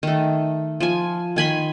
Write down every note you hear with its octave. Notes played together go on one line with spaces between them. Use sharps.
D#3 A3
F3 G#5
D#3 G#5 B5 C6